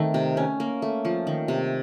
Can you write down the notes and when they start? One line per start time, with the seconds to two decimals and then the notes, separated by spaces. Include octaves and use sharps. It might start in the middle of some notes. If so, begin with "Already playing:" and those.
Already playing: D#3 A3 C4
0.14 C3
0.37 C#4
0.60 A#3
0.82 A3
1.05 F3
1.27 D#3
1.48 C3